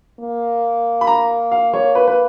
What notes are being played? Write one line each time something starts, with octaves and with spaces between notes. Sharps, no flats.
A#3
B5
A#5
F5
C#5
B4
B4